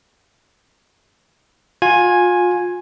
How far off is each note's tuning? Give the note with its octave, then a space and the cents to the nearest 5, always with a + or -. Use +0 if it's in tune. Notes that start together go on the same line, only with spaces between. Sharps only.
F4 +30 G#5 +0